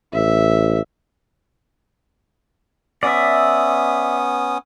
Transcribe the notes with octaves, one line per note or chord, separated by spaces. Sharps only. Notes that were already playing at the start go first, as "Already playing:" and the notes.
A1 E5
B3 C#4 D5 E5 D#6